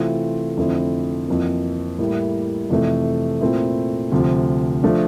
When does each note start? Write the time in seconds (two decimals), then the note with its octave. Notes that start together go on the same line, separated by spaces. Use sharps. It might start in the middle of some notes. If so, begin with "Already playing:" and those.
Already playing: C3 E3 A3 C4 F4
0.57 F2 D3 A3 C4 E4
1.28 F2 E3 A#3
1.99 A2 G3 A#3 E4
2.70 F2 C3 E3 A3
3.41 A#2 A3 C4 E4
4.12 D2 C3 F3
4.83 F3 A3 D4 F4